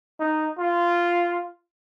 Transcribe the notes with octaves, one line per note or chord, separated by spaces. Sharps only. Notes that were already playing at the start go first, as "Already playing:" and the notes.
D#4
F4